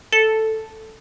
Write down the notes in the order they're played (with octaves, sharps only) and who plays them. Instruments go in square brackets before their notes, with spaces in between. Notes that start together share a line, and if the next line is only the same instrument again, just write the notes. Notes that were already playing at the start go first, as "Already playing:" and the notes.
[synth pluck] A4